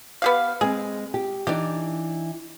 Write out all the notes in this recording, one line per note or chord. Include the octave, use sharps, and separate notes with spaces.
B3 G4 F5
G#3 C4 G#4
G4
E3 D4 D#4 G4 D5